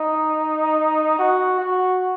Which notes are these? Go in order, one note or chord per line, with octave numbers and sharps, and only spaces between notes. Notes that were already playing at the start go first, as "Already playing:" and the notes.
Already playing: D#4
F#4
F#4